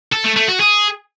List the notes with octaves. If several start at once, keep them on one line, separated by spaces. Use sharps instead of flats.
A4
A3
A3
F#4
G#4